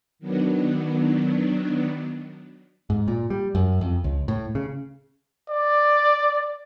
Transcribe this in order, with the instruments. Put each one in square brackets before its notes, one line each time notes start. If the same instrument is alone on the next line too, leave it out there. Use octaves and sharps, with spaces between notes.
[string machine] D#3 F#3 B3 D4
[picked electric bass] G#2
A#2
G3
F#2
F2
C#2
A2
C#3
[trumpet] D5